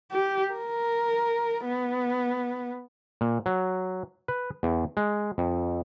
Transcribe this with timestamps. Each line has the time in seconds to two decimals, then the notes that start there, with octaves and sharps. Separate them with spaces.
0.11 G4
0.53 A#4
1.65 B3
3.21 A#2
3.46 F#3
4.28 B4
4.63 E2
4.97 G#3
5.38 F2